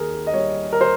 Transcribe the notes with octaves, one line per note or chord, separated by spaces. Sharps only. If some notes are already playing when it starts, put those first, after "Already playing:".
Already playing: D#2 D#3 G#4 A#4
D#5
G3 C#5
A#4
C5